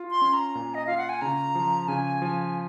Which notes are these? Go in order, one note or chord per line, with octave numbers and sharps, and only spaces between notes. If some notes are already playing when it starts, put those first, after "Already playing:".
Already playing: F4
C6
C#4
A#5
A#2
D#5
F4 F5
F#5
G#5
C#3 A#5
F3
C#3 G#5
F3